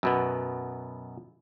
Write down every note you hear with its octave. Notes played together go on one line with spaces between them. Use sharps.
F#2 B2 B3